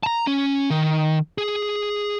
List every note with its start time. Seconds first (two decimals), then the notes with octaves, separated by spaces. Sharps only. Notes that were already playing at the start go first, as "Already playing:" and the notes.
0.03 A5 A#5
0.27 C#4
0.70 D#3
1.38 G#4